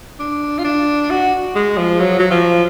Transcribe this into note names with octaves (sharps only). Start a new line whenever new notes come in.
D4
F4
D4
F#4
G#3
F3
F#3
F#3
F3